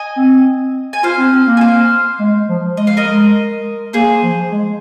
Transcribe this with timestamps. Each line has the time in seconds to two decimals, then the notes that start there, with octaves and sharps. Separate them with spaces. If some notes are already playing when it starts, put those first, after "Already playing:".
Already playing: D#5 G#5
0.16 C4
0.93 G#5
1.03 F4 C5 F5
1.18 C4
1.32 C4
1.47 A#3
1.57 G#5
1.61 C5 F5
2.19 G#3
2.48 F3
2.77 G#3 D#5
2.87 F5
2.97 A#4 D#5
3.06 G#3
3.93 A#3 G#4 C5
4.22 F3
4.51 G#3